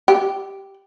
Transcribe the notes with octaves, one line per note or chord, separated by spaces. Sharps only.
G4